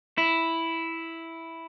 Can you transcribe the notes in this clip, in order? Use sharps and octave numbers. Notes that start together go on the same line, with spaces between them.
E4